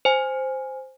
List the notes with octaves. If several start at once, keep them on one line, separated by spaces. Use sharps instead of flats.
C5 G#5